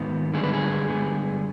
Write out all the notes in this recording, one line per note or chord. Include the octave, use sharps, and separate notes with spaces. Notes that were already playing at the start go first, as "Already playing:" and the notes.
Already playing: G#2 D#3 B3
G2 D3 G#3 B3 G#4
B4
G#4
G2 D3 G#3 B3